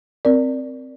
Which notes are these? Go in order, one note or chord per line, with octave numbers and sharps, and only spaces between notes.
C4 A#4 D5